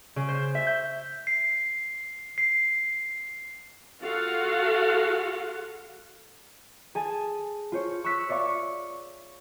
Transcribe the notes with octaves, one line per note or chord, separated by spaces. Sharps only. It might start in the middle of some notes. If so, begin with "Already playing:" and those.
C#3
C5
E5
G6
C7
C7
F4 F#4 G#4 A4 F5 F#5
G#4 G#5 A5
F4 C5 C#5
C#6 E6 F#6 B6
C#5 D5 E5 F5 C#6